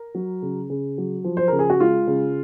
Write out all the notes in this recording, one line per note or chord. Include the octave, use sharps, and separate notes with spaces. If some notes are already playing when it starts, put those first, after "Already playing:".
Already playing: A#4
F#3
C#3
C#3
F#3
F3
C5
C#3 A#4
G#4
F#4
G#3 F4
C#3